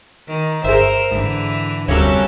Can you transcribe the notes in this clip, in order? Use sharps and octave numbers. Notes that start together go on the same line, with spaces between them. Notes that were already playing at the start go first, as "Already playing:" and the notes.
D#3
G1 G#4 A#4 C5 E5
G#2 D3 E3
F1 D2 C3 F#3 G3 A#3 C#4 A4